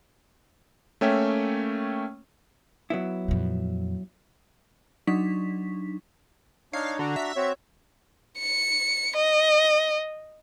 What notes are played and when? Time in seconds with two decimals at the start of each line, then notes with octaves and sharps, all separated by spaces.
1.01 A3 A#3 C#4 C#5 E5 G5
2.90 F#3 B3 E4
3.28 F2 A#2
5.07 F#3 D4 D#4 C#6 B6
6.73 D4 D#4 C#5 F5
6.99 D3 D4 F#4 A#5
7.16 E5
7.37 C4 F#4 C#5
8.39 C#7
9.17 D#5